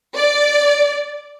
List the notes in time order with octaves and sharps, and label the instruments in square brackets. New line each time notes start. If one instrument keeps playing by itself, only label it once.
[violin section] D5